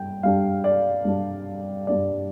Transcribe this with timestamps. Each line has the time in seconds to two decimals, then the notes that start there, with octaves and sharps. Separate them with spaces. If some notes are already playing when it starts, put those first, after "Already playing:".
Already playing: G2 G3 G5
0.23 G2 G3 D4 F5
0.64 D5
1.05 G2 G3 D4
1.87 G2 G3 D4 D5